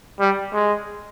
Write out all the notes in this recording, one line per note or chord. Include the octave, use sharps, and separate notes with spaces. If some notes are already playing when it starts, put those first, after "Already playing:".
G3
G#3